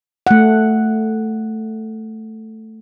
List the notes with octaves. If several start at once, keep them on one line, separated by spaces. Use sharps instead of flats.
A3 F#5